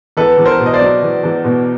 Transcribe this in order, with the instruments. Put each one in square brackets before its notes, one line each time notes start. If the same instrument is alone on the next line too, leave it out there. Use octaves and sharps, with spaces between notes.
[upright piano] E2 [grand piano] A4 B4
[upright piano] E2
[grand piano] A#4 C5
[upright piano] B2
[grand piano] D#5
C5 D5
[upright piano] F#3
E2
E2
B2